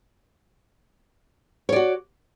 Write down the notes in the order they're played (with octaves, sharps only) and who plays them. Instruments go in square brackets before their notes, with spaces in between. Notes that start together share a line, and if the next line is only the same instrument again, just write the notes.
[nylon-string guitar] C#5
D5
F#4